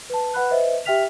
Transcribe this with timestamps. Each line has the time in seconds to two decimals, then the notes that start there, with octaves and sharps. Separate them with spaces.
0.10 B4 A5
0.34 B4 F#5 B5 F#6
0.51 B4 C5 D#5 E5
0.85 G4 E5 G5 F6 B6 F7